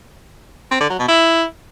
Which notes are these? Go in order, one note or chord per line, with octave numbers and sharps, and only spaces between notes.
C4
D3
F#3
B2
E4